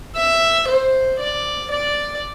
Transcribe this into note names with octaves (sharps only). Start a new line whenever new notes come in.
E5
C5
D5
D5